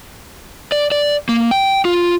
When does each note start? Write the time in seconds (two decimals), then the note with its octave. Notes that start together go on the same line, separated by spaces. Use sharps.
0.72 D5
0.92 D5
1.29 A#3
1.51 G5
1.85 F4